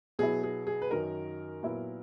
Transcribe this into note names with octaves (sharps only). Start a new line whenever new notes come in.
B2 F#3 B3 E4 G#4
G#4
G#4
B4
F#2 D#3 F#3 A#4
A#2 F#3 B3 E4